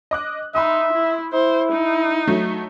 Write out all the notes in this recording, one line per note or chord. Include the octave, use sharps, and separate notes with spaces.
D#5 D6 F#6
D#4 E5 B5 C6 D#6
E4
E4 C5
D#4
F#3 A3